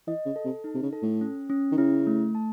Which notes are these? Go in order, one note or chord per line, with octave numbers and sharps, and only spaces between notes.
E3 D#5
C#3
A4
C3
D#4
C3
C#3
A4
A2
C#4
C#4
D#3
C#3 E4
A3
A5